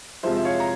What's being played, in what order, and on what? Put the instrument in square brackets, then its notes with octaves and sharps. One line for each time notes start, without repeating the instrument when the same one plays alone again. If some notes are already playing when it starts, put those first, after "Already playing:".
[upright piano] F2 C3 F3 G#3 C5 E5
E5
C#5 F5
A#5